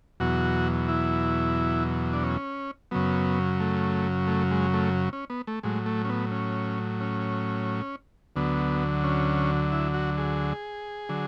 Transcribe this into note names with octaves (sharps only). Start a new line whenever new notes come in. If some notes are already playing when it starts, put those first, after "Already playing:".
E2 B2 F#3 F#4
E4
D4
C#4
F#2 C#3 F#3 B3
A3
A3
G#3
A3
C#4
B3
A3
A2 F#3 G#3
A3
C#4
B3
C#4
C#4
D2 D3 F#3 B3
C#4
E4
F#4
G#4
D3 F#3